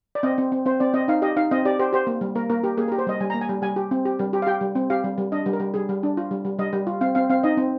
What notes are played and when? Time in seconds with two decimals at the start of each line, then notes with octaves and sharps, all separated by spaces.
0.15 D5
0.23 C4 D#5
0.38 C4
0.52 C4
0.66 C4 C5
0.80 C4 D5
0.94 C4 D#5
1.08 D#4 F5
1.22 G4 D#5
1.36 D#4 F5
1.51 C4 D#5
1.65 G4 D5
1.79 G4 C5
1.93 G4 C5
2.07 A#3
2.21 G3
2.35 A#3 A#4
2.50 A#3 A#4
2.63 G4 A#4
2.77 A#3 G#4
2.88 A#4
2.92 G4
2.98 C5
3.07 G3 D#5
3.20 G3 G#5
3.30 A#3 A#5
3.41 G#5
3.49 G3
3.62 G3 G#5
3.76 G4
3.91 C4
4.05 G4
4.19 G3
4.33 G4
4.42 F5
4.47 G4 G5
4.61 G3
4.75 C4
4.90 G4 F5
5.04 G3
5.18 G3
5.32 D4 D#5
5.46 G3
5.53 A#4
5.60 G3
5.74 G3 G#4
5.89 G3
6.03 D4
6.17 F4
6.31 G3
6.45 G3
6.59 G3 D#5
6.73 G3
6.87 F4
7.01 C4 F5
7.15 C4 F5
7.30 C4 F5
7.44 D#4 D#5
7.57 C4